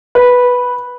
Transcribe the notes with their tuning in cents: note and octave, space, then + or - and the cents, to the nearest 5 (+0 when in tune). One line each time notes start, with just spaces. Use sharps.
B4 -5